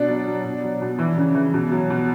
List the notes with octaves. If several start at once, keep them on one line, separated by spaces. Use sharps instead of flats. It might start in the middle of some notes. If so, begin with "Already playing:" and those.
Already playing: B2 D4 D5
F#3
F#3
B2
F#3
B2
E3
C#3
E3
B2
F#3
B2